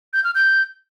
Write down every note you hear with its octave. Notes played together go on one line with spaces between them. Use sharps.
G6
F6
G6